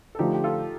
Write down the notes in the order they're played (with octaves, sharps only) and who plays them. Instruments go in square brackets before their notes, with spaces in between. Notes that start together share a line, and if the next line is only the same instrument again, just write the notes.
[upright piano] A4
[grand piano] D3 F3 A3 [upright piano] D#4 G4
[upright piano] G4
F4 A4